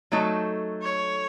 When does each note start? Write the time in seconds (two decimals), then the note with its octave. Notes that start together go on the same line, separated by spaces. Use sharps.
0.12 F#3 A3 D#4 A4
0.83 C#5